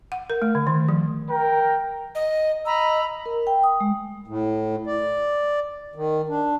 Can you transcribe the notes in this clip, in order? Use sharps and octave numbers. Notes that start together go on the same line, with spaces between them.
F#5
A#4
A3
D3
D#3
F3
A#4 G5
D#5
D#5 A#5 B5 E6
A#4
G5
D#6
G#3
A2
D5
D#3
D4